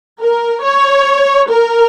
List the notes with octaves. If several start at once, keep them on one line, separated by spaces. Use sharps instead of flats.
A#4
C#5
A#4